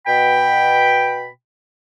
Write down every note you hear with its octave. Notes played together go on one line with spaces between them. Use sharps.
B2 G5 B5